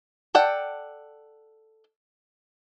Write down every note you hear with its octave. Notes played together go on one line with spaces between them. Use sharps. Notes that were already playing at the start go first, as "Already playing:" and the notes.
A4 D5 F#5 G5